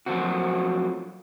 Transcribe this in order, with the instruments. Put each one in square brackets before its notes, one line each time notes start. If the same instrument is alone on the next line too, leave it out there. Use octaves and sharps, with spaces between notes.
[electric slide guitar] F3 F#3 A3 A#3 C4 F#4